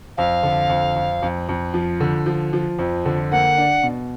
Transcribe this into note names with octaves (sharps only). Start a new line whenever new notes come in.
F2 F5
D3
F2
F2
F2
F2
F3
D3
F3
F3
F2
D3
A#3 F#5
D4
B2